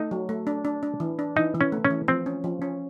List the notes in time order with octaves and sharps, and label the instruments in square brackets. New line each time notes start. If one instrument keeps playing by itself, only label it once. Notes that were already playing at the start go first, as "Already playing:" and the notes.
Already playing: [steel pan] A3 [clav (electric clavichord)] D#4
[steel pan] F#3
A3
D4
D4
D4
E3
D4
[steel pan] E3 [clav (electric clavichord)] D#4
[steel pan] E3
[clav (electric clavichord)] C#4
[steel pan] A3
[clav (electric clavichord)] C#4
[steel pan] E3
[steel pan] F3 [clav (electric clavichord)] C4
[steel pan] C#4
F3
C#4